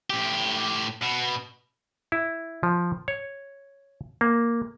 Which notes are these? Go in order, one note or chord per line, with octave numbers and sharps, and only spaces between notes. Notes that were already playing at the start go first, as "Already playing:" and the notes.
A2 G4
B2
E4
F3
C#5
A#3